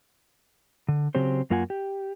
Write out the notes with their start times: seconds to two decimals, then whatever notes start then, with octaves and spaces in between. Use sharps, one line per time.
0.88 D3
1.15 C#3 F#3 C4 G4 C5
1.50 F#2 A#3 F4 F#5 G#5
1.70 G4